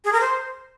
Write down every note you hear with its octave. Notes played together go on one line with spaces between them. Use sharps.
G#4
A#4
C5